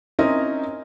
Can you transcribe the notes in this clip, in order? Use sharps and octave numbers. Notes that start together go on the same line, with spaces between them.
C4 C#4 D#4 E4 A#4 D#5